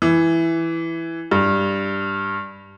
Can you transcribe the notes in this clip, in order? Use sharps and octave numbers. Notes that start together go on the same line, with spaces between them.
E3
G2